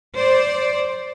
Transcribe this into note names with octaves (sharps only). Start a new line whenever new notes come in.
C5 D5